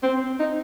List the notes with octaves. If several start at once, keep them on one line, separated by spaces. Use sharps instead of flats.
C4
D#4